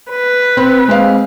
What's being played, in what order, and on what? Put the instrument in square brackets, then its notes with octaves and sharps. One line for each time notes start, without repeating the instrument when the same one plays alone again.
[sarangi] B4
[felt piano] C4
G#3 C4 F5